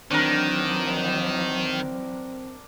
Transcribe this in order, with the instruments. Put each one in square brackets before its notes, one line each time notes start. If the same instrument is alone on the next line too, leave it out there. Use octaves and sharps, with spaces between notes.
[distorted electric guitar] D#3 [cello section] E3 F#3 [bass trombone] C4 [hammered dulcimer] D4 A#4